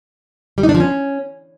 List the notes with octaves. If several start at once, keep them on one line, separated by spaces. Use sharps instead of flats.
G3
D#4
D4
F3
C#4